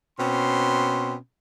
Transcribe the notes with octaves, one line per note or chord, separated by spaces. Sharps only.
B2 C4 C#4 C6